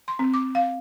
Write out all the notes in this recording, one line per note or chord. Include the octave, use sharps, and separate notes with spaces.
C6
C4
D6
F5